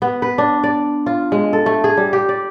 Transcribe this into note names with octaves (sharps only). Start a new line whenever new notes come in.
B3
B4
D4
D5
F4
G#3
A4
A3
G#4
G3
G4
D5